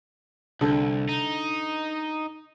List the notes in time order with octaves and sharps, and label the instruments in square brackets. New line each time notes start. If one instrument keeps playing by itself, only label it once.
[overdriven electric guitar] C2 [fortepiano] D3
[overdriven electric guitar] D#4